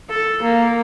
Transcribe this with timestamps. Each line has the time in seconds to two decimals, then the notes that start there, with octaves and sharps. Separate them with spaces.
0.10 A4
0.43 A#3